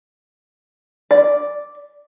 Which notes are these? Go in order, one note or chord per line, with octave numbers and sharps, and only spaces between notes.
D5